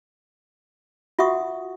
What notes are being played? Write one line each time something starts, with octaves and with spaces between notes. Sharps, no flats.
F4 F#4 E5 F#5 C#6 D#6